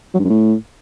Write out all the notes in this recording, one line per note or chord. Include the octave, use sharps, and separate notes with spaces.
F#3
G2
F#2
A2